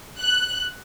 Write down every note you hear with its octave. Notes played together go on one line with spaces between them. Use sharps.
F#6